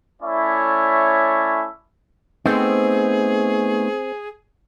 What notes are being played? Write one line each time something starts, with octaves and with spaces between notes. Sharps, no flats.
A3 C#4 E4 C#5 D5 E5
A3 B3 C4 D#4 G#4